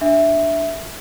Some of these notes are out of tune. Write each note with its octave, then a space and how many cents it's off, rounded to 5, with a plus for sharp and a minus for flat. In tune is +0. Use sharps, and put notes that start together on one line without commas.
D4 +0 E5 +0